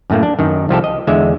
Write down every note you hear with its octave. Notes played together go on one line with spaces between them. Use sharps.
F#2 A2 A3 A#3
D4
F#2 D#3
C2 F3 G4 A4
D#5
E2 D3 G#3 E5